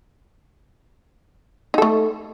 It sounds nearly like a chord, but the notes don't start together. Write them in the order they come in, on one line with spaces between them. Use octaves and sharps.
D#4 A4 A3